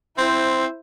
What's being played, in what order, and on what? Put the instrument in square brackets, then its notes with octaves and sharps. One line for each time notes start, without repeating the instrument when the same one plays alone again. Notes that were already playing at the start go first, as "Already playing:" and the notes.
[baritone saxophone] C4 [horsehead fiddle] E4 C5